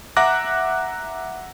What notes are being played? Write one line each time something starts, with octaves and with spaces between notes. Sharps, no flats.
E5 F#5 A#5 D6 F#6 A#6